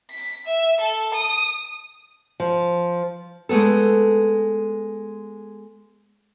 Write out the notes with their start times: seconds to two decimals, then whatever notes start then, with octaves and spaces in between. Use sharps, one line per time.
0.11 B6
0.46 E5
0.81 A4
1.14 D#6
2.40 F3
3.49 G#3 A3 B3 A4